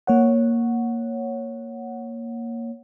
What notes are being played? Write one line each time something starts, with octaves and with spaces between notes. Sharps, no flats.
A#3 C#5 F#5